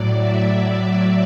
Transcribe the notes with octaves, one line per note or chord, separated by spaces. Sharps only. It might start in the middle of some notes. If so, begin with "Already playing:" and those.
Already playing: A2 F#3 D5
E5